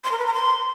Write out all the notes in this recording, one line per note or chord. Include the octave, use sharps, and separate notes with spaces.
C6
A#4
B4
A#5
C6